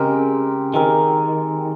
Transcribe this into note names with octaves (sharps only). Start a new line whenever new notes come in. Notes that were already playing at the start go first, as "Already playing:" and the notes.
Already playing: C#3 G#3 C4 G4 A#4
D#3 G#3 C4 G4 A#4